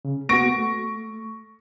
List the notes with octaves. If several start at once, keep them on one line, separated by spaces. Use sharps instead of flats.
C#3
A#3 B3 F#4 C#6 A#6 D7
A3